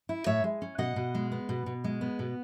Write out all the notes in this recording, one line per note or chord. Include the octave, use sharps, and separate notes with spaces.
E4
A2 C#5 E5
G#3
C#4
B2 D#5 F#5
B2
G#3
B3
B2
B2
G#3
B3
B2